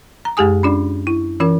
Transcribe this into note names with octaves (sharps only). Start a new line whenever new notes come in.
A#5
F#2 G#3 G4 G#4 G#5 D#6
C#4 D4 F4 D5
E4
E3 C#4 F4 A#4